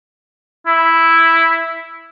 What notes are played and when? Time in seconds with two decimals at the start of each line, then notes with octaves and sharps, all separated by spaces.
0.66 E4